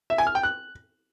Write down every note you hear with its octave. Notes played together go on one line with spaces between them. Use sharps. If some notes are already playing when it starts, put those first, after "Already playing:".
E5
G#5
F6
G5
F#6